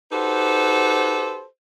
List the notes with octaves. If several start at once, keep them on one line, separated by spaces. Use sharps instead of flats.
D#4 F#4 G4 A4 B4 C5